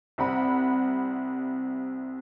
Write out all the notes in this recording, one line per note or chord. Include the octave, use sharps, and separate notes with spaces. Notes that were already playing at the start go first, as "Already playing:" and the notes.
C2 C4 F#5 B5